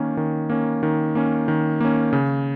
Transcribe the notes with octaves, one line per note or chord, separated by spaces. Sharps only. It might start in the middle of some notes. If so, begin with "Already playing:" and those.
Already playing: D#3 A#3 C#4
D#3
A#3 C#4
D#3
A#3 C#4
D#3
A#3 C#4
C#3